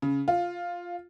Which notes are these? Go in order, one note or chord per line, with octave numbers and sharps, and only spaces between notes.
C#3
F4